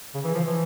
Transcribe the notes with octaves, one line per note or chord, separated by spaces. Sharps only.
C#3
E3
F3
E3